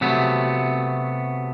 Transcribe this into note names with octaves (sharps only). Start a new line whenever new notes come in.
C3 F#3 A3 B3